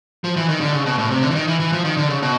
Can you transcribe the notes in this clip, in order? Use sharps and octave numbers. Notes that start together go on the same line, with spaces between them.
F3
E3
D#3
D3
C#3
B2
A2
C3
D3
E3
D#3
E3
E3
F3
D#3
D3
C#3
B2